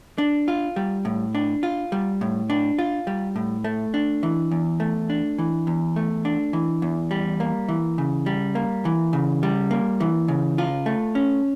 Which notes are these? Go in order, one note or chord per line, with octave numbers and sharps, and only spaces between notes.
D4
F4
G3
A2
D4
F4
G3
A2
D4
F4
G3
A2
A3
D4
E3
E2
A3
D4
E3
E2
A3
D4
E3
E2
G3
A#3
E3
C#3
G3
A#3
E3
C#3
G3
A#3
E3
C#3
F4
A3
C#4